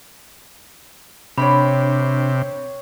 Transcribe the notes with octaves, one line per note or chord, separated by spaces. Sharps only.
C3 D4 C#5 G5 B5